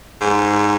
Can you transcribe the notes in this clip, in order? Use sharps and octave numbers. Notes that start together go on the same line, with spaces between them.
G#2